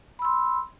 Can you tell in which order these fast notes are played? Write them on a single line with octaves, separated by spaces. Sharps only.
B5 E6 C6